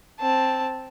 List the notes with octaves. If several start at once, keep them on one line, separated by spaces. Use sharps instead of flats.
C4 A5